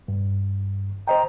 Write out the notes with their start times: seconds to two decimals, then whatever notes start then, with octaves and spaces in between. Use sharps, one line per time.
0.08 G2
1.08 C5 D#5 G5 A#5